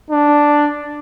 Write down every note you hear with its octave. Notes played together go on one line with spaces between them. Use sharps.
D4